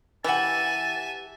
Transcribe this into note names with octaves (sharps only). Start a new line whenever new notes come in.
E3 G4 E5 F#5 G#5 A5